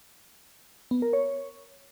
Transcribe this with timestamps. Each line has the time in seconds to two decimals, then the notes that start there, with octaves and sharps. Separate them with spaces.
0.91 B3
1.02 A#4
1.13 C#5